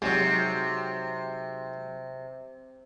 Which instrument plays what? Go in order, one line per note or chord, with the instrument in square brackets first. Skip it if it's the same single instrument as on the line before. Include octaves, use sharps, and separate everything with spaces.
[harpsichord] G#2 F#3 [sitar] C3